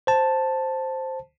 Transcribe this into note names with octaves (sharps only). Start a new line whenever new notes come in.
C5 A5